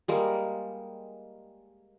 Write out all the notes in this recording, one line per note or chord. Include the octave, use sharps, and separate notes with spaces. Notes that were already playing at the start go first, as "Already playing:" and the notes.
G3 G#3 A#3